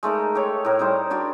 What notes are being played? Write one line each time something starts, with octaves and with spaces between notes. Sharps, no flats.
G#3 A3 D#4 A#4
G4 A4 C#5
A2 A#4
G3 D#4 C5
D4 F#4 C#5 D5